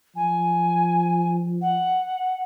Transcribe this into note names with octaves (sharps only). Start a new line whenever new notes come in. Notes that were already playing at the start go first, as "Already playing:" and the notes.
F3 G#5
F#5